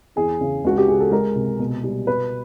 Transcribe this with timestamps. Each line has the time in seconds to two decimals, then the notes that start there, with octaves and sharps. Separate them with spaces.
0.16 E2 G#4
0.41 C#3
0.64 C#2 F#4
0.78 G4
0.88 C#3 G#4
1.00 A4
1.11 G#3 A#4
1.36 C3
1.59 B2
1.84 G3
2.07 B2 B4